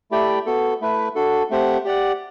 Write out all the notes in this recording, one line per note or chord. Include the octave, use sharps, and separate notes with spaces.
A3 E4 G4 D5 G5
B3 F#4 A4
A3 E4 B4
D4 F#4 A4
A3 C4 G4 C5 F#5
G4 D5 F#5